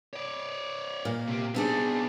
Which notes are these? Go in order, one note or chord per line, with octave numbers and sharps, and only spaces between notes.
C#5 D5
A#2 A#3
C3 G4
B3 C4 D4 D#4 G#4